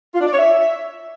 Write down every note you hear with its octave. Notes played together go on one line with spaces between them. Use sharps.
F4
D4
D5
C#5
E5